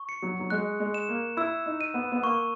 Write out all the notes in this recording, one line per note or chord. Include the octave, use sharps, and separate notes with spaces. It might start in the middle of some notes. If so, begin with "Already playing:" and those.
Already playing: C#6
C#7
F#3
F#3
G#3 F#6
G#3
E7
A#3
E4 E6
D#4
D#7
B3
B3
A#3 C#6